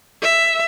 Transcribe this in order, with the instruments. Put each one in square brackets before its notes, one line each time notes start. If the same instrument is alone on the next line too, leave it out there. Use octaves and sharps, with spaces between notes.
[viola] E5